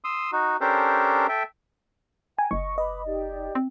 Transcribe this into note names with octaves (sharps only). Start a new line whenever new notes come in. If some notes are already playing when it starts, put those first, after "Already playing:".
C6 D#6 E6
D#4 F#4
C#4 D4 G4 A4 A#4 C5
A4 E5 G5
G5 G#5 A#5
F#1 D#5 C#6
B4 D#5 B5 D6
D#4 G4 D5
C4